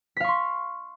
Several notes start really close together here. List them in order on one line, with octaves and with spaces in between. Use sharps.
B6 F5 C#6 C6